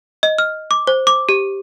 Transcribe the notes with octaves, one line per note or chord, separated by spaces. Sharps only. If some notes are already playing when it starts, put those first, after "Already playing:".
D#5
F6
D6
C5
D6
G4